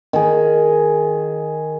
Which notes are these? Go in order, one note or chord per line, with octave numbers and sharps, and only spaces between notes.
D#3 G#4